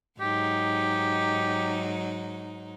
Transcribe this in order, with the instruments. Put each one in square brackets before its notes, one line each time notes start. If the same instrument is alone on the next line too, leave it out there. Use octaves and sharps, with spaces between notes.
[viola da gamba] G#2 F#3 D#4 [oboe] G4